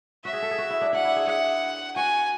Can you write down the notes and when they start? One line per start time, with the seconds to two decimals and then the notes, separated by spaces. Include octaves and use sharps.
0.24 F#4 E5
0.33 G#4
0.42 A4
0.51 G#4
0.58 F#4
0.70 E4
0.81 D4
0.93 D4 F#5
1.04 E4
1.16 G#4
1.27 G#4 F#5
1.96 F#4 G#5